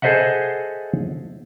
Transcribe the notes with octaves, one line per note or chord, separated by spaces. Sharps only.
G#4 A4 C5 D#5 E5 F#5